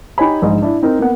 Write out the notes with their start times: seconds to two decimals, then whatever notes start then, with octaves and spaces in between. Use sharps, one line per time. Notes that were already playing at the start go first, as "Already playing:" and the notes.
0.18 D#4 G4 C#5 G#5 B5
0.42 A#1 G#2 D#5
0.62 D4 E4
0.83 C4 D#4 A#4
0.99 A#3 B3 F#5